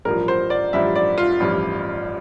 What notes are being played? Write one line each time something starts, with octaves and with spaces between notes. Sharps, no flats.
A1 G2 F3 A#4
C5
D5
A1 G2 F3 E5
D5
F4
A1 G2 F3